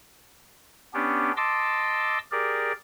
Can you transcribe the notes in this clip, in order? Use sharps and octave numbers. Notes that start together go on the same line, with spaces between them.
B3 C#4 D4 G4
D#5 A5 C6 D6 E6
G4 G#4 A#4 D5